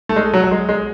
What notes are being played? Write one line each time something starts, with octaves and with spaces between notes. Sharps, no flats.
A3
G#3
F#3
F#3
G#3
G#3